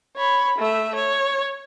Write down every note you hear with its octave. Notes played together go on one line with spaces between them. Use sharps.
C#5 B5
A3 E5
C#5